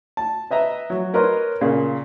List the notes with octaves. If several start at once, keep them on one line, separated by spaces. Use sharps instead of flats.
A5
B4 D#5 E5 A#5
F#3
A#4 B4 C#5 D#5 A#5 C6
A#2 C#3